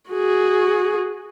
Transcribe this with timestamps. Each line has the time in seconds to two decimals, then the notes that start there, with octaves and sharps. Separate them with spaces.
0.11 F#4 G#4